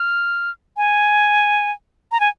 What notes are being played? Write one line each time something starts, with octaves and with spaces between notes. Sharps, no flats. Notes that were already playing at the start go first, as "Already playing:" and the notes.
Already playing: F6
G#5
A#5
G#5